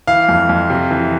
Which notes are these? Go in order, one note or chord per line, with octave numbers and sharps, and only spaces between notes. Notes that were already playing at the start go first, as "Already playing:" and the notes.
E3 F5
F2
F2
C3
E3